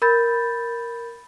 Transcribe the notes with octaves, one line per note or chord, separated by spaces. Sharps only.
A#4 B5 G6 A6